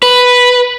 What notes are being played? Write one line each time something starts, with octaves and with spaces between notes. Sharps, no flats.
B4